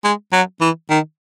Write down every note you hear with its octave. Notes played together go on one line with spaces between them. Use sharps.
G#3
F#3
E3
D#3